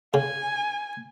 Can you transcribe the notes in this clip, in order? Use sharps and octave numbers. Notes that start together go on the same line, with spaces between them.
C#3 G#5